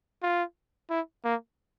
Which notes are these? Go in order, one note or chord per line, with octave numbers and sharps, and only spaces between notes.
F4
E4
A#3